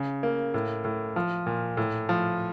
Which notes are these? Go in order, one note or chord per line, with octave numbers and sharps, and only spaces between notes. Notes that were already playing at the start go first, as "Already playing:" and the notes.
Already playing: C#3
A#3
A2
A2
F3
A#2
A2
F3